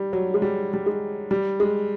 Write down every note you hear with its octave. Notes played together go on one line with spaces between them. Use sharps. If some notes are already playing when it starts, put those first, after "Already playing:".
Already playing: G3
F#3
G#3
G3
G3
G#3
G3
G#3